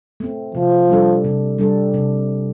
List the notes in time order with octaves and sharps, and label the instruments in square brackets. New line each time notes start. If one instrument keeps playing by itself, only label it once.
[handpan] A3 C4
[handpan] C3 [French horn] F3
[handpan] G3 D4 A4
C3
G3 D4 A4
C3